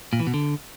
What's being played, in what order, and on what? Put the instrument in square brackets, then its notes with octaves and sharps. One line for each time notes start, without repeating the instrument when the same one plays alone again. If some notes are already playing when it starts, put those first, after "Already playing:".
[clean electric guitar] A#2
E3
B2
D3